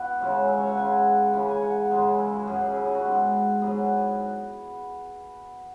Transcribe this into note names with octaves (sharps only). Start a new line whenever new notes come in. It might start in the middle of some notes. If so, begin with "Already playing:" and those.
Already playing: B2 B3 E4 F#4 B4
C#3 E3 G#3 C#4
E5
C#5
F#5
C#3 G#3 C#4 G#5
C#3 E3 G#3 B5
G#5
F#5
F#2 C#3 E3 G#3
E4
F#4
F#2 F#3 C#4 G#4
G#4
C#4
E4
G#4
F#4
G#2 G#3 B3
G#2 F#3 B3 G#4